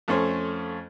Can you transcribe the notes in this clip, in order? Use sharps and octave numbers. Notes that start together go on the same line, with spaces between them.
F2 A3 C#4 C5